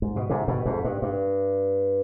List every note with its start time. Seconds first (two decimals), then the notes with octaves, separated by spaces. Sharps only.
0.02 G#2
0.16 B2
0.29 G#2 C3
0.48 G2 B2
0.65 F2 G#2
0.84 G2
1.02 G2